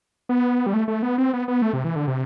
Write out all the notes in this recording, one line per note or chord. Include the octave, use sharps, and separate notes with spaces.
B3
G3
A3
A3
B3
C4
B3
B3
A3
C3
E3
D3
C3